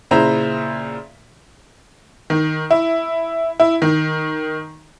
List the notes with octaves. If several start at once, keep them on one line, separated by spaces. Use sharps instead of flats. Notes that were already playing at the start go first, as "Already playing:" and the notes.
A#2 C#3 E4 C5 E5 A#5
D#3
E4
E4
D#3